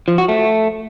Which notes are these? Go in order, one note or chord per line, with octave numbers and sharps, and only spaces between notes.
F3
F#4
A3